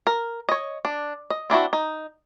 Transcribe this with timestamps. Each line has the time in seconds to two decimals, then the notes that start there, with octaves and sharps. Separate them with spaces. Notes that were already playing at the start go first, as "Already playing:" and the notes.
0.07 A#4
0.49 C#5 D#5
0.85 D4
1.30 D#5
1.50 C4 D4 E4 F#4
1.73 D#4